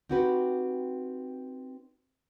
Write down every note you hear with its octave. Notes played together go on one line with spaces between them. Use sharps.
C4 D#4 F#4 G4 B4